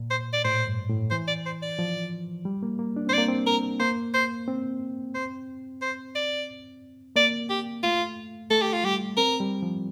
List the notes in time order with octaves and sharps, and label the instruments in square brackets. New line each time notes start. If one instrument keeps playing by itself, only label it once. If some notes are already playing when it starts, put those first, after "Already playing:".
Already playing: [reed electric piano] A#2
[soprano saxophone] C5
D5
[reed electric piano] A2 [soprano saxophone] C5
[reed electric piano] G2
A2
[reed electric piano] E3 [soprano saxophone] C5
[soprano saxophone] D5
C5
D5
[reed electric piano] F3
G3
A#3
A#3
D4
[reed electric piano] C4 [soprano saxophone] C5
[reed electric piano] A#3 [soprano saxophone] D5
[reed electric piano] C4
[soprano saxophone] A#4
[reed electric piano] A#3 [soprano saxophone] C5
[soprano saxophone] C5
[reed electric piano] C4
[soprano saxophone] C5
C5
D5
[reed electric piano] A#3 [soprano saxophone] D5
[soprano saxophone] G4
[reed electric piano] A3 [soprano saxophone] F4
[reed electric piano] A3 [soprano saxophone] A4
[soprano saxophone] G4
F4
[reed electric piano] G3 [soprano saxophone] G4
[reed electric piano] C4 [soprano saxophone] A#4
[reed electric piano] G3
F3